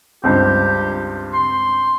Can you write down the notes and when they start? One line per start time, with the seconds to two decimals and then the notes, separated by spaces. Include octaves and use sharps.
0.24 C#2 G2 C4 G4
1.34 C6